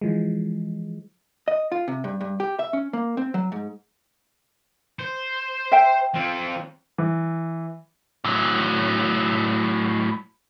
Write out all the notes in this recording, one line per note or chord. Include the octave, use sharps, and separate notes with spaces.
E3 F3 G#3
D#5
F4
C3
G2
G2
G4
E5
C#4
A#3
C4
F#3
G#2
C5
E5 G5
F3 C4
E3
A2 F#3